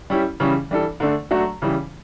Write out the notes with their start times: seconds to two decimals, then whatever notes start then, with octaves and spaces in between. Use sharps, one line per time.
0.10 G3 C#4 E4 G4
0.40 C#3 E3 G3 C#4
0.71 E3 G3 D4 A4
1.00 D3 A3 D4
1.31 F#3 A3 D4 F#4 A4
1.62 C#3 E3 G3